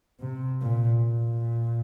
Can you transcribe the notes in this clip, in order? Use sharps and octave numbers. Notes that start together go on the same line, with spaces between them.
C3
A#2
A#2